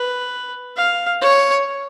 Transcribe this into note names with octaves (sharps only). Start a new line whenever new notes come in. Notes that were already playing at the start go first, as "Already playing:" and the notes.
Already playing: B4
F5
C#5